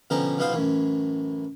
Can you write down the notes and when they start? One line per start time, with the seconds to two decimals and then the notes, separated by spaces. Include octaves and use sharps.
0.10 B2 D3 F3 C#4 G4 A#5
0.38 B1 B2 B3 F4 C5 C6
0.52 F#2 A2 E3